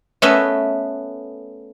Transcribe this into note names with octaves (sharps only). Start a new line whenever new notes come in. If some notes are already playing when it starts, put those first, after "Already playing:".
A3 B3 C#4 B4 D#5 E5